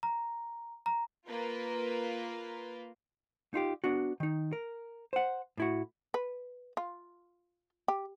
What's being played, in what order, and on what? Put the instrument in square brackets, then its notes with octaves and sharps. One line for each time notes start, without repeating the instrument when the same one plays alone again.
[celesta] A#5
A#5
[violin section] A#3 F4 B4
[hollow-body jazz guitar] D#4 F4 G4
B3 D4 F#4
D#3 D#4
A#4
C5 F#5
A2 E4 F#4
[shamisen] B4
F4
G4